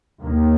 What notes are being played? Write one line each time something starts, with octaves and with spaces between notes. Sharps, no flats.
D#2 D#3 A#3